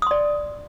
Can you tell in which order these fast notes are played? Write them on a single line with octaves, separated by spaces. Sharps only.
D#6 C6 D5